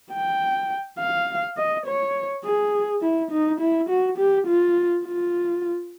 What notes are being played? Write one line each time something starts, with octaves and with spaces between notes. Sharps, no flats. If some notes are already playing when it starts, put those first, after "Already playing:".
G5
F5
D#5
C#5
G#4
E4
D#4
E4
F#4
G4
F4
F4